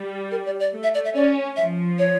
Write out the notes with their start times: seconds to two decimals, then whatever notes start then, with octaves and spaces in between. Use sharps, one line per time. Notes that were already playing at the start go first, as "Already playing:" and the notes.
Already playing: G3
0.31 A#4
0.46 D5
0.60 D5
0.73 A3
0.83 E5
0.95 D5
1.05 E5
1.15 C#4 D5
1.56 F3 E5
1.99 C#5